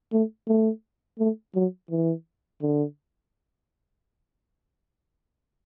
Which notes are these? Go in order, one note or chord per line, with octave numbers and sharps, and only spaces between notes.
A3
A3
A3
F#3
E3
D3